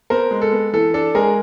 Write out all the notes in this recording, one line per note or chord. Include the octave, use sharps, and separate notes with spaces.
B3 A#4 C5
G#3
A4
B3
E3 A4
D4 A4
G#3 G#4 A#4